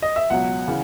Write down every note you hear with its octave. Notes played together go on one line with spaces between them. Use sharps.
D#5
E5
C#2 B2 F#3 F#5
C#3 E3